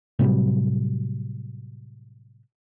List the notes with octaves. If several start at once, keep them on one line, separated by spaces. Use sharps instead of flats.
A2 C3 F#3 G3